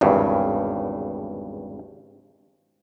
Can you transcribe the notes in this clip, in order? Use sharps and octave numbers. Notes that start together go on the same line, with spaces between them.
G#1 E2 G2 C#3